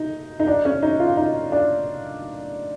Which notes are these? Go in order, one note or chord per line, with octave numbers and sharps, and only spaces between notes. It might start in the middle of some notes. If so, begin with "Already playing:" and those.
Already playing: D#4
D#4
D4
C#4
D#4
F4
D#4
D4